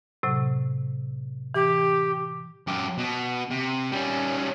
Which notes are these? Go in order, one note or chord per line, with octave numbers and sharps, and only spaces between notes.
A2 C3 F#3
E3 G4
F#2 G4
B2
C3
G3 C#4